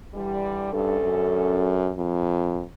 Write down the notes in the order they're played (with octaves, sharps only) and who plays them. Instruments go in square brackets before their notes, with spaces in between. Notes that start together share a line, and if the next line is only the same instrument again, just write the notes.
[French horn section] D3 E3 G3
[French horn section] D2 C#4 A4 [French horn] G2
[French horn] F#2
F2